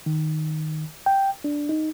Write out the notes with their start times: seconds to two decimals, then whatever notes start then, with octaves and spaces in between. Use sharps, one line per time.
0.06 D#3
1.06 G5
1.44 D4
1.69 D#4